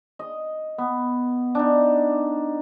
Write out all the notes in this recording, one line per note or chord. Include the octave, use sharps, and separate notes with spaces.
D#5
B3
D4 D#4